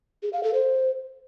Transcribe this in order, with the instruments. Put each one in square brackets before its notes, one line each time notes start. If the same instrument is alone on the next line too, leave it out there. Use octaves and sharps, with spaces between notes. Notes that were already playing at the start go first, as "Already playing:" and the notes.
[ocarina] G#4
F5
A4
C5